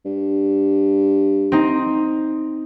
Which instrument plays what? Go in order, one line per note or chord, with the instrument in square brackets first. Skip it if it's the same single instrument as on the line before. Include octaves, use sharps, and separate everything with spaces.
[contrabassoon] G2
[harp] C4 D#4